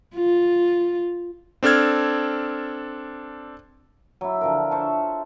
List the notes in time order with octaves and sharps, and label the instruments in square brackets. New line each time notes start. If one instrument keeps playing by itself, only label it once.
[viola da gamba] F4
[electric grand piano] C4 D4 A4 F6 G#6
[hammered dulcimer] F#3 E4
D3 F3 A#4
C5 E5 A5 C#6